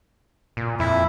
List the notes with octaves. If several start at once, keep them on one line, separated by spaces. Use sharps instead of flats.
A#2
F2 E4